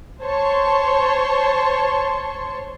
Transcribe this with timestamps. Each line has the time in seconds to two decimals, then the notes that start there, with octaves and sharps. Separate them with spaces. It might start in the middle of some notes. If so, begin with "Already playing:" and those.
0.22 C5 C#5 A5 C6 C#6